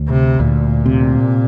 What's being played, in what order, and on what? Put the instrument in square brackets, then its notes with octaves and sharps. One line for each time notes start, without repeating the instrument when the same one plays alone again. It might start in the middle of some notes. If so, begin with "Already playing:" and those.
Already playing: [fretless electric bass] D2
[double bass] C3
[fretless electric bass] D2 [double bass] A#2
[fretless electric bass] C3